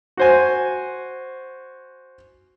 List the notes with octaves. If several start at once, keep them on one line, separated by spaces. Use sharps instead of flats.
F#4 C5 G#5